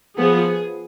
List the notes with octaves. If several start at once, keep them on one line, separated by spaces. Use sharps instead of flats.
F3 B3 G#4